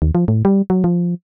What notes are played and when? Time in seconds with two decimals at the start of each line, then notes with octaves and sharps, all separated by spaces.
0.02 D#2
0.15 F3
0.28 A2
0.45 G3
0.70 F#3
0.84 F3